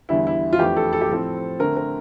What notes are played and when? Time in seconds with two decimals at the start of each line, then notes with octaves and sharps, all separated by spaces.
0.09 E2 D3 G3 E4
0.27 E4
0.53 F4
0.59 F2 E3 A3 D4 G4
0.77 A4
0.93 A4
1.01 G4
1.09 A2 F3 C4 A4
1.59 D3 A3 C4 A#4
1.77 A#4